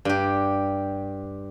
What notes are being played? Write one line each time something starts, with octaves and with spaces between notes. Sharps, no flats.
G2 G4